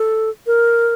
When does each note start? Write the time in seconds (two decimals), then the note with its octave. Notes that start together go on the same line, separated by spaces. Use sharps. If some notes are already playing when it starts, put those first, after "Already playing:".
Already playing: A4
0.47 A#4